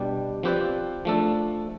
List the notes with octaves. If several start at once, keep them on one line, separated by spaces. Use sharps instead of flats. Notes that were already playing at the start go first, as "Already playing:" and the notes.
Already playing: B2 G3 D4 G4 D5
F3 C4 G4 B4 D5
F3 A3 D4 A4